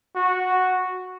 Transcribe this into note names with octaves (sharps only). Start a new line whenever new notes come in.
F#4